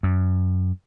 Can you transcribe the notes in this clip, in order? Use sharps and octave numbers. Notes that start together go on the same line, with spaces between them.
F#2